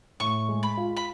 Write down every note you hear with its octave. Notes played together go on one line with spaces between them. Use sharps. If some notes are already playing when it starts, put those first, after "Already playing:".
A2 C#6
G#3
B5
F4
B5